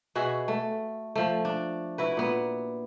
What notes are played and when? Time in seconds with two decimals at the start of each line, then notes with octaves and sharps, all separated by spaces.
0.15 B2 F#4 G#4 E5
0.48 A3
1.16 F3 A3
1.45 D4
1.98 E4 F#4 B4
2.17 A#2 B3